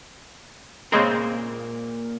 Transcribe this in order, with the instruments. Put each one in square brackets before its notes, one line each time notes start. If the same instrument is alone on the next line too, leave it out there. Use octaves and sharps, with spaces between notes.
[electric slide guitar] A#2 A#3 A#4 [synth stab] C#3 G#3 C4